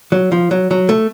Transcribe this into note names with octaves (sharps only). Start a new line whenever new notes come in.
F#3
F3
F#3
F#3
A3